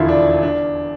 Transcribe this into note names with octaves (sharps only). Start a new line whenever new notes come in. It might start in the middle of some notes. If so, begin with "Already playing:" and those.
Already playing: E1 D#2 D3 E4 F4
D4
D4